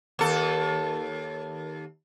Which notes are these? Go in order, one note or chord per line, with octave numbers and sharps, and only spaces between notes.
D#2 A4